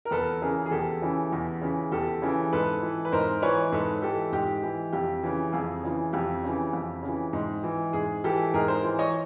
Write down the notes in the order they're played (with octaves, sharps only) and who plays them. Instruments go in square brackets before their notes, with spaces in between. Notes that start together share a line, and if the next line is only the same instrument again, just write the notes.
[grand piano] A#4
E2 A4 B4
C#3 E3 G#4 A#4
G#4
E2 G4 A4
C#3 E3
E2
C#3 E3
E2 G4 A4
C#3 E3
G#2 A4 B4
E3
B4
G#2 A#4 C5
E3 B4 C#5
G#2 A4 B4
E3 G4 A4
G#2 G4
E3
F2 G4
C#3 E3
F2 G#4
C#3 E3
F2 G4
C#3 E3
F2
C#3
E3
G#2
E3
G#2 G#4
E3 G4 A4
G#2 G#4 A#4
A#4 C5
E3
C#5 D#5